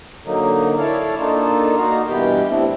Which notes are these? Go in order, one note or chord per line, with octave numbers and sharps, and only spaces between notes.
D3 F#3 A#3 D#4
E4 A4 C#5 D5 F5
A#3 D4 D#4 F4 A4
A#3 D#4 F#4 F5 A#5
G2 B2 E3 B3 G4 G5
G3 A3 C4 D4 E4